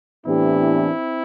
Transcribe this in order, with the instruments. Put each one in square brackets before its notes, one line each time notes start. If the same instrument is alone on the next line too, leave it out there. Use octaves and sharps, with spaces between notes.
[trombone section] A2 E3 B3 D4 G4 [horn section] C4 E4